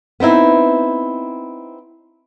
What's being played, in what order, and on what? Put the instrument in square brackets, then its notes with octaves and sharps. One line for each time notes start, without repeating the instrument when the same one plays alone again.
[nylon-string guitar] B3 C4 D#4 E4